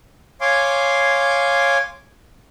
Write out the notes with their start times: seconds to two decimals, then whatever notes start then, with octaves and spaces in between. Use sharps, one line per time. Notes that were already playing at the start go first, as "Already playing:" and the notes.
0.41 C#5 F5 G#5 C6 D6